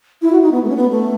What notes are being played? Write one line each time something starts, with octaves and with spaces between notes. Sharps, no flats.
E4
F#4
D#4
B3
A3
C#4
B3
A3